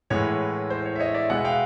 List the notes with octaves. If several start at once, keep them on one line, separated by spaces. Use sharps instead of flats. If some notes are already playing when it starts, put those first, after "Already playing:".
A2 E3 G#3 B3 C#5
C5
C#5
E5
C#5 D#5
D5 E5
B2 G#3 B3 E5 F#5
F5 G5